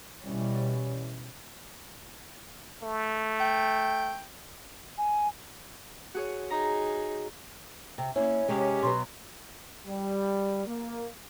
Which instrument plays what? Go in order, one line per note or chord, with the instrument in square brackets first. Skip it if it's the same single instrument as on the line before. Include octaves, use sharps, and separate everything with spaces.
[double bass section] B2 E3 G3 C#4
[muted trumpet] A3
[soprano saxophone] G5
[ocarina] G#5
[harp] F#4 G#4 C#5
[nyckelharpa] D#4 G#4 [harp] A#5
[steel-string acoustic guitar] C3
[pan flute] A#3 [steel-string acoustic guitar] C#4 E4 [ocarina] C#5
[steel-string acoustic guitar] C3 G#3 [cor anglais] C#4 [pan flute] G4
[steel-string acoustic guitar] B2 F#3 B3 [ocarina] C6
[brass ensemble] G3
A#3